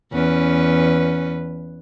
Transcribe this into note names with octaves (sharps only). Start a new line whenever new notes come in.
E2 C#4 B4